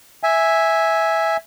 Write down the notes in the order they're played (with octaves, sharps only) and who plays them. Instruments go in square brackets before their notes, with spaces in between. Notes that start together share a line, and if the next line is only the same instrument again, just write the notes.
[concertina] E5 G#5